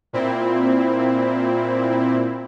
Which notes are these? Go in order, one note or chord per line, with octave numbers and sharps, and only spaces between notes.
A#2 C4 E4